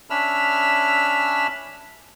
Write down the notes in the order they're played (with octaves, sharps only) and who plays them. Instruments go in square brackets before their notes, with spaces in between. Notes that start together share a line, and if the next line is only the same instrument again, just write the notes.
[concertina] C#4 D4 E5 B5 E6 F6